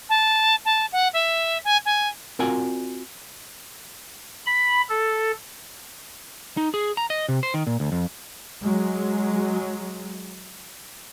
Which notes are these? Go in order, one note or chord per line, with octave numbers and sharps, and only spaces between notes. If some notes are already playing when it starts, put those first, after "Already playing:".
A5
A5
F#5
E5
G#5
G#5
C4 F4 F#4 A#4 D5 G#5
B5
A4
D#4
G#4
A#5
D#5
C3
C5
D#3
A#2
D2
F2
F#3 G#3